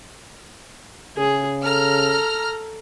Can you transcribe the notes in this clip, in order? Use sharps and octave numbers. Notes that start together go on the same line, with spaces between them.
C#3 G#4
A4 A#5 F6